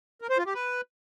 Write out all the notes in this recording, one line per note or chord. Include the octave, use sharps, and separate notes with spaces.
A#4
C5
F4
G4
B4